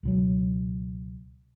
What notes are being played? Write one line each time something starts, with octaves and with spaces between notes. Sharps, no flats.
C#2 B2 F#3